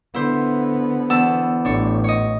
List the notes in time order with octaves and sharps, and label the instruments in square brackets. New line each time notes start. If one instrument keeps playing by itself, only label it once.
[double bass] D3 B3 [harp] E4 C5
[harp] E2 A5 E6
[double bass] A1 [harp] D4 C#5
[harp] C#5 D#5